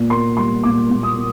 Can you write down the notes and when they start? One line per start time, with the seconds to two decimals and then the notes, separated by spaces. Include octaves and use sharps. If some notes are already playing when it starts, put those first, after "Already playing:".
Already playing: A#2
0.10 A#3 C6
0.37 G3 C6
0.63 A#2 D6
0.89 A#2
1.03 D#6
1.16 A#3